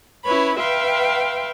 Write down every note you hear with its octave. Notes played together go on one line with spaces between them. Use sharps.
C#4 E4 B4 C#5 B5
B4 E5 F5 G5 C6